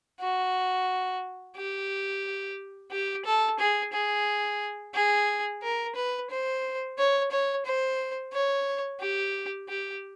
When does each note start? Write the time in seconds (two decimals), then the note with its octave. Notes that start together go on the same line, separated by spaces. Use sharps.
0.20 F#4
1.56 G4
2.92 G4
3.25 A4
3.59 G#4
3.93 G#4
4.94 G#4
5.63 A#4
5.95 B4
6.30 C5
6.98 C#5
7.31 C#5
7.66 C5
8.33 C#5
9.00 G4
9.69 G4